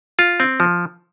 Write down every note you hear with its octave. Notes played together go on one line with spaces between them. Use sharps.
F4
C4
F3